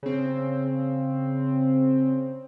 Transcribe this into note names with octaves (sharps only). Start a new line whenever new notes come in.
C#3 C4